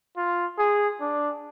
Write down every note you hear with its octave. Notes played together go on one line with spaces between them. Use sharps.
F4
G#4
D4